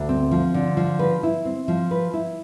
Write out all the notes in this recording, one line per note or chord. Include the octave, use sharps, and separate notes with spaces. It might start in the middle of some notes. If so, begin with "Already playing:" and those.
Already playing: D2
C4
F3
D3
F3
B4
E4
C4
F3
B4
E4